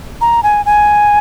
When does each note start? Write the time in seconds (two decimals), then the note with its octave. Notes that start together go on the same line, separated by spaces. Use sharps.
0.21 A#5
0.43 G#5
0.66 G#5